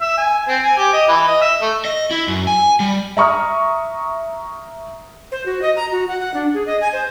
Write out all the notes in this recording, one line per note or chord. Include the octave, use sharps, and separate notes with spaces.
E5
G#5
C4
G#5
G4
D#5
E3
D#5
E5
A3
D#5
E4
F#2
G#5
G3
E5 A#5 C#6 D#6 F6
C5
F#4
D#5
A#5
F#4
F#5
F#5
D4
G#4
D#5
G#5
C5